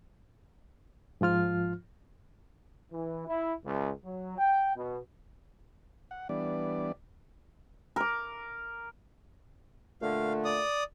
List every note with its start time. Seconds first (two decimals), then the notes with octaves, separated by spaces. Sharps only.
1.21 G#2 F3 F4 F6
2.92 E3
3.27 E4
3.65 C#2
4.04 F#3
4.38 G5
4.76 B2
6.11 F#5
6.29 E3 G3 B3 D4 D5
7.96 A#4 D6
10.02 A#2 D3 A3 F5
10.45 D5 D#6